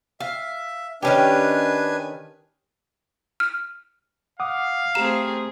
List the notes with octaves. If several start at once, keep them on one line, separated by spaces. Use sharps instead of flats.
E5 F5
D#3 C#4 D4 G4 B4 G#5
F6
F5 F#5 D6 D#6
A3 C4 G4 G#4 A#5 E7